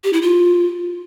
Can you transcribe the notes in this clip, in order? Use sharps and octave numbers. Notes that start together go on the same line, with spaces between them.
G4
E4
F4